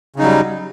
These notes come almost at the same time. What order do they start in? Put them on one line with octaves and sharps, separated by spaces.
C#3 D#4 F#3 G3